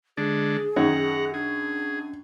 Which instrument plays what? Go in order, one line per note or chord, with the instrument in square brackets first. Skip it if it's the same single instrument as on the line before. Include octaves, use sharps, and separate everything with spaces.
[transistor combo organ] D3 G#3 D4 [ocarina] G#4
[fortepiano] F#2 D#3 C#5 [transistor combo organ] F#5 A#5
[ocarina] D4 [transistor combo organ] G#4